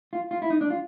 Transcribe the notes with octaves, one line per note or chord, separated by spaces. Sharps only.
F4
F4
E4
D#4
D4
F4